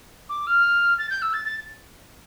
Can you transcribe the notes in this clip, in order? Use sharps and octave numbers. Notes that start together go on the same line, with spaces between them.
D6
F6
A6
G6
E6
A6
A6